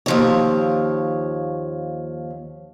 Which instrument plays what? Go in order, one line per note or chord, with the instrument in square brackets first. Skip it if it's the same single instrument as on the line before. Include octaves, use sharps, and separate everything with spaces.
[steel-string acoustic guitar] D#2 F3 C#5